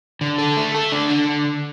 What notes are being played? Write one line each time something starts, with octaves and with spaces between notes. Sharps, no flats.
D3
A4
A3
A4
D4
D3